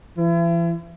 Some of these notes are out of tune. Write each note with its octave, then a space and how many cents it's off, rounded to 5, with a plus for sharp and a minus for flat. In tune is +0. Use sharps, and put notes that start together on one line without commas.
E3 +40 E4 +40